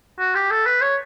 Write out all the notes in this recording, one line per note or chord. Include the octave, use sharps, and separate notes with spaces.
F#4
G4
A4
B4
C#5